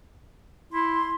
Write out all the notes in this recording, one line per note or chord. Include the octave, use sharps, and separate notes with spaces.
E4 C6